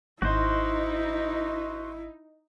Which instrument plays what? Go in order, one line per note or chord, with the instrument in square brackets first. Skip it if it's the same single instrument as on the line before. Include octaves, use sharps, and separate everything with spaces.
[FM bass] G#1 [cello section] D#4 [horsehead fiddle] E4 [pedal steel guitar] F#4 C5